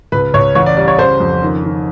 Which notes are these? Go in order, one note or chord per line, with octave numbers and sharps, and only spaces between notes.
C#2 B4
C#2 C#5
A1 C#5
D5
G3 D5
C#5
C#3 C5
F2
D#3
D#3